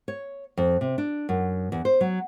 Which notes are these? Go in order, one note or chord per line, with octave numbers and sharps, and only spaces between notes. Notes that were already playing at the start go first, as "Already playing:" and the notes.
C#5
F2
C3
D4
F#2
E2
C5
F#3